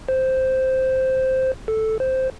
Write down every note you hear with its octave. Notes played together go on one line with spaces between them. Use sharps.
C5
A4
C5